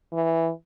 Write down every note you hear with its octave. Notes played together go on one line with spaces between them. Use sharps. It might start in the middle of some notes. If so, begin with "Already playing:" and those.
E3